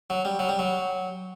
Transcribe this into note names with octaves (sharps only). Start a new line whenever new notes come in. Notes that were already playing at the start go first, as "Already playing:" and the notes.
F#3
G3
F#3
G3
F#3